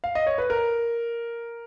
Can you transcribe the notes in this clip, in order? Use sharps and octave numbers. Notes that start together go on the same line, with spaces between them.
F5
D#5
C#5
B4
A#4